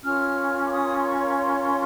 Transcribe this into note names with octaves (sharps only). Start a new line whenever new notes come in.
C#4 F4 A#4 C#5 F6
D6
D#6
C6
C#6
C6